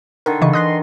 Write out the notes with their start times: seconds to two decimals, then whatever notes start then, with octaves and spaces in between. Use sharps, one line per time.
0.26 D3 D#3 A#4
0.42 C#3 E3 D#5 C#6
0.53 E3 D#5 C6 D#6 F#6 A#6